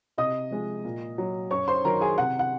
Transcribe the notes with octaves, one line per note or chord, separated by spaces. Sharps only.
C3 D#5 D#6
F3 G#3
A#2
F#3
F#2 C#5 C#6
C5 C6
D#3 F#3 A#4 A#5
G#4 G#5
C3 F#5
F#5